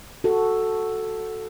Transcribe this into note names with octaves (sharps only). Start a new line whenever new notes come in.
F#4 A4